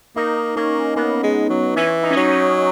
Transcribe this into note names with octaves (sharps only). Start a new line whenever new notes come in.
A#3 D#4
A#3 C#4
A#3 B3
G#3
F#3
E3 C#4
D#4
C#4
F#3 D#4
C#4